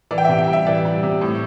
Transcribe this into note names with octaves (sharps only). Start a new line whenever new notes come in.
E3 D5
G5
E5
C3
G5
G3
E5
E3 D5
G3
C3
A2